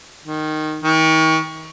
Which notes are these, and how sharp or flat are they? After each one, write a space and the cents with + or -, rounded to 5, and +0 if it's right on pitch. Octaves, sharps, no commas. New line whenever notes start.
D#3 -10
D#3 +40